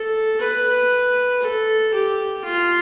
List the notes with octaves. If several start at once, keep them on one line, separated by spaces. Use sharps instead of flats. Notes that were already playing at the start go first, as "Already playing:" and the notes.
Already playing: A4
B4
A4
G4
F4